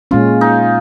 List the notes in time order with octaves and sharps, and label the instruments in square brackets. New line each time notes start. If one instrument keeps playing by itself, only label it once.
[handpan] A#2 G#3 C#4 [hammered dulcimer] F4
[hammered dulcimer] D#4